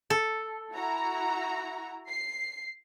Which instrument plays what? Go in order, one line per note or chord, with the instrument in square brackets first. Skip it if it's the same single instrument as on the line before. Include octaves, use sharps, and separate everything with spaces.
[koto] A4
[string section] E4 F#4 A#5
C7